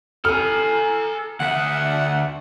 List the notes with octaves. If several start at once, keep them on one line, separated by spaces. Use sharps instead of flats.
A4 G#5 F6
D2 E5 F#5